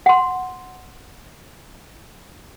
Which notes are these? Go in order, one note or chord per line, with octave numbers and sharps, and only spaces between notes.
F#5 C6